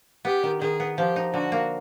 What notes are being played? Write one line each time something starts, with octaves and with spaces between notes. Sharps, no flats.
B3 G4
D#3
D#3 G#4
B3
F3 G4
D#4
D3 F#4
A#3